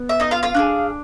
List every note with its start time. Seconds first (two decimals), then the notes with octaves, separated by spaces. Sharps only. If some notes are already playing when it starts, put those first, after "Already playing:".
Already playing: B3
0.09 E5
0.20 D#4 D#5
0.31 F4 F5
0.43 F4 F5
0.54 D4 F4 G#4